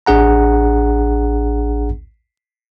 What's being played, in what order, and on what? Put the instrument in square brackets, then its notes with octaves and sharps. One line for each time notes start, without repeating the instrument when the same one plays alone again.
[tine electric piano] A1 D4 G#4 F#5 A#5